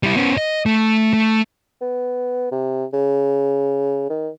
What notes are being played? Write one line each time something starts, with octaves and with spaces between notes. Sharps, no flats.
G3 E4
B3 C#4
D#5
A3
A3
B3
C3
C#3
D#3